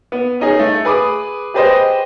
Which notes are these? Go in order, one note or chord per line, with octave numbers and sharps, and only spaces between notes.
B3
C#4 D#4 G#4
A3
G#4 B4 B5 D6 D#6
G4 G#4 B4 C5 D#5